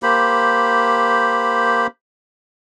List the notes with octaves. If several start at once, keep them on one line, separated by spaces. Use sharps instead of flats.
A#3 G4 C5 B5